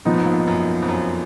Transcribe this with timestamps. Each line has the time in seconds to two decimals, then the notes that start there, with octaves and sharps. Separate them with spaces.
0.05 A#2 F3 B3 D#4
0.14 G#2
0.23 A#1 A#2
0.39 G#2
0.47 F#2
0.82 F2
0.88 F#2